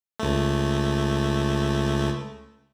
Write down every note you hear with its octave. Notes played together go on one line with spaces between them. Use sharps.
C#2 A3